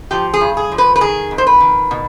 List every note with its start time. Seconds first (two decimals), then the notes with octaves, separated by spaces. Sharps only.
0.11 F3 G4
0.34 G#4
0.41 G2
0.57 G#4
0.72 F3
0.78 B4
0.96 B4
1.01 D#3 G#4
1.31 F2
1.38 C5
1.47 B4
1.60 D#3
1.91 B2